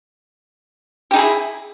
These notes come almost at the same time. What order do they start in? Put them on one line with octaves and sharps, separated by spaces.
G4 D#4 G#4 E4